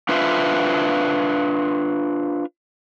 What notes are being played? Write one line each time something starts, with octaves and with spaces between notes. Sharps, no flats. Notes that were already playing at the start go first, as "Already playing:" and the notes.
D4 F4 B4 C5 E5